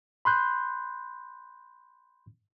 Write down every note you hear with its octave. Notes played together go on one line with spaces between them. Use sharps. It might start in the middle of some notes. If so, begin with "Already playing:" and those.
B5 C6 F#6 G6